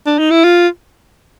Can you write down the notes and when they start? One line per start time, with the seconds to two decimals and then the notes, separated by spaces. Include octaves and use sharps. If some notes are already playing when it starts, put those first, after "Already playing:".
0.06 D4
0.19 D#4
0.31 E4
0.44 F4